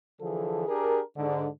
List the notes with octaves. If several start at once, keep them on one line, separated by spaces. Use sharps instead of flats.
D3 E3 F3 G#4 A4
D4 G4 G#4 A#4
G#2 D3